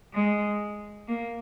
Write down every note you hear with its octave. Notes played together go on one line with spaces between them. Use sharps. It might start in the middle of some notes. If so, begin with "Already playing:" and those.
G#3
A#3